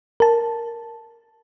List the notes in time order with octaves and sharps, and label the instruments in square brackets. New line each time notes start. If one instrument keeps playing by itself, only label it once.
[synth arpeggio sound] A#4 A5